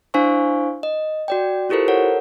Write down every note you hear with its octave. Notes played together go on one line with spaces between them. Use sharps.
D4 E4 C5 F5 G#5 C#6
D#5
F#4 D5 G5
E4 F4 G4 A4 A#4 C5
A4 A#4 C#5 F#5